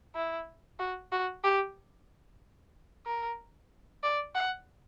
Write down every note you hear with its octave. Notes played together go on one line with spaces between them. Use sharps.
E4
F#4
F#4
G4
A#4
D5
F#5